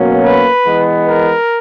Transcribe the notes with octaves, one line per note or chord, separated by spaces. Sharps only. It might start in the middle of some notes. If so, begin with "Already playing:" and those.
Already playing: B2 F#3 A#3 C#4
B4
E3 G#3 B3
A#4